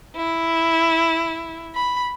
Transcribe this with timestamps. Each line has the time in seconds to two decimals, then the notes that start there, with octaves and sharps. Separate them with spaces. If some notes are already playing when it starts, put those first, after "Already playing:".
0.16 E4
1.75 B5